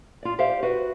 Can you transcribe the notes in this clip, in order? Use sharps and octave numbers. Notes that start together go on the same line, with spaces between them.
F4 D5
G4 C5 D5 E5 F5
F#4 B4